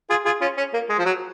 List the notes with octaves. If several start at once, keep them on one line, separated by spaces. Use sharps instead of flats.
F4 G#4
F4 G#4
C#4 F4
C#4
A#3
G#3
F3
F#3